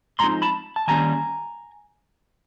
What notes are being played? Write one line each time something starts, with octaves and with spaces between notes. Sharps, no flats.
G#2 F3 G#3 C4 D#4 A#5 C6
A5 B5
A5
D#3 G3 A#3 C#4 G#5 A#5